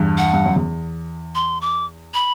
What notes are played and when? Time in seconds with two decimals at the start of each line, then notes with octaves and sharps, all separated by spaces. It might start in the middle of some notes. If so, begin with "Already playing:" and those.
Already playing: E2 G2
0.18 F#5
0.33 G2
0.46 F#2
0.56 E2
1.35 C6
1.62 D6
2.14 B5